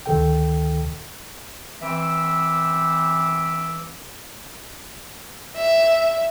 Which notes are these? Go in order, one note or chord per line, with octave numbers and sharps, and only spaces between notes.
D2 D#3 A4 G5
E3 C4 E5 D6 E6
E5